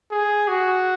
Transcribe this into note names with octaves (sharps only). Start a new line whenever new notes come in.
G#4
F#4